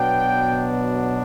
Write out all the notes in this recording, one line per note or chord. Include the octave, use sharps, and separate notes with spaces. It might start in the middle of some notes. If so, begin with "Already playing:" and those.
Already playing: B2 F#3 B3 D4 G5